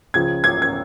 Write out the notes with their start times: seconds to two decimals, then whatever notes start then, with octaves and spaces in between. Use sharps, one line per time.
0.14 C#2 C#3 F3 G#6
0.44 G#6
0.62 G#6